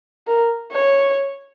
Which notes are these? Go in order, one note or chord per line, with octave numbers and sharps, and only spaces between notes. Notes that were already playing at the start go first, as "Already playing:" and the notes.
A#4
C#5